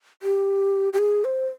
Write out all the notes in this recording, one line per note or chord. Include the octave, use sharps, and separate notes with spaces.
G4
G4
G#4
C5